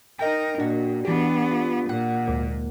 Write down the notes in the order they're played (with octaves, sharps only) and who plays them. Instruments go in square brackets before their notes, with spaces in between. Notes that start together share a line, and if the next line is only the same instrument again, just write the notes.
[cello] D#4 A#4 [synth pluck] D#5 G5
[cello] A#2 [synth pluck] D4 F#4
[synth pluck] E3 G4 [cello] B3 D4
[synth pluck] F4
[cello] A#2 [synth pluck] F#5
[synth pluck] D2 G#2 A#3